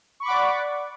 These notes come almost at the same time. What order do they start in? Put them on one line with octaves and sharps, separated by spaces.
C#6 B5 D6 F#5 D5